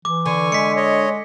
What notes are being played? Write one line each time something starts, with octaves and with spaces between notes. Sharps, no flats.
E3 D6
D3 G#5 C#6
G#3 B6 C#7
C#5 D#5